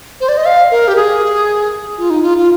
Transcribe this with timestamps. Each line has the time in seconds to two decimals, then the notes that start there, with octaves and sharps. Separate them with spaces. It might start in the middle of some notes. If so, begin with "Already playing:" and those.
0.21 C5
0.29 D5
0.37 D#5
0.45 F5
0.71 A#4
0.88 G4
0.96 G#4
1.98 F4
2.10 D#4
2.22 F4
2.38 F4